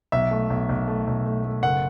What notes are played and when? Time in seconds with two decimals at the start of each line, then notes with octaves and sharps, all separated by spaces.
0.12 B1 E5
0.31 A3
0.50 B1
0.69 B1
0.88 A3
1.07 B1
1.26 A3
1.44 A3
1.63 F#1 F#5